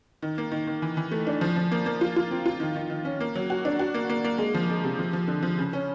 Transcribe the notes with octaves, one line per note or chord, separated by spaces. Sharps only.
D#3
A#3
D#3
D#3
E3
E3
A3
D4
F3
F3
A#3
A#3
F4
F4
C4
F4
D#3
D#3
D#3
C#4
A#3
F#3
F#4
D4
F#4
A#3
A#3
A#3
G#3
F3
G#3
C3
F3
F3
D3
F3
C#3
C#4